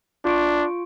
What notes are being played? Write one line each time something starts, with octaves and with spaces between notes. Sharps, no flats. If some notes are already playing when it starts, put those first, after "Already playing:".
D4 F4 C#6 D7